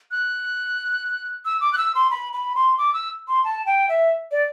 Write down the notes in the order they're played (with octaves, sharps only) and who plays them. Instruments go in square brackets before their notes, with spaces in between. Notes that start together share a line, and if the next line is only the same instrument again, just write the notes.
[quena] F#6
E6
D6
F#6
E6
C6
B5
B5
C6
D6
E6
C6
A5
G5
E5
D5